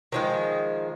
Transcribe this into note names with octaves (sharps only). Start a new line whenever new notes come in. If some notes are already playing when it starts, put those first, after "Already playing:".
D#3 F3 G#3